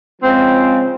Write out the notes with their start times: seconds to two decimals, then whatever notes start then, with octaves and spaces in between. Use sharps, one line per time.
0.22 C#3 F3 G#3 C4